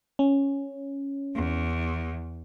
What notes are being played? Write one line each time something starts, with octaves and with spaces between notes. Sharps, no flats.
C#4
E2